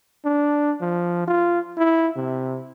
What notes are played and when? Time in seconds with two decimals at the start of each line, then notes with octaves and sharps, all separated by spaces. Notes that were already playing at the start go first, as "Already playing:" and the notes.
0.25 D4
0.81 F3
1.28 F4
1.78 E4
2.16 C3